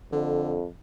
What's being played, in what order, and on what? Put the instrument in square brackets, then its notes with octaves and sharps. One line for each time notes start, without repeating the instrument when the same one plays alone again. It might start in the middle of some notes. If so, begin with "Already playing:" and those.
[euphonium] F2 [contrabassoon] D3